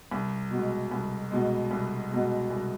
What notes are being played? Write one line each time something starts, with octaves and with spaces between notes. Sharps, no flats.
C2
B2 G#3
C2
B2 G#3
C2
B2 G#3
C2